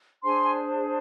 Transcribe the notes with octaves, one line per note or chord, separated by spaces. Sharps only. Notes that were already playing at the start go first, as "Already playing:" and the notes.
D4 G#4 C5 G#5 C6
G#5